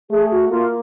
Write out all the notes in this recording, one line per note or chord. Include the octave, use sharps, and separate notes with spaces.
A3 G#4
F#4
A#3 F4